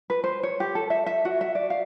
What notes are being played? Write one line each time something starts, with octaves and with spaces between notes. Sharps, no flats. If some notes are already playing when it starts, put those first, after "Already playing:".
B4
C5
C#5
G4
A4
E5
E5
F#4
E5
D5
F5